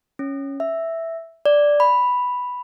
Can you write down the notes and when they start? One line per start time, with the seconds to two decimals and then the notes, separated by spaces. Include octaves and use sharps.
0.19 C#4
0.60 E5
1.46 D5
1.80 B5